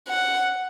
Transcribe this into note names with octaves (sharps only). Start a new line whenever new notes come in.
F#5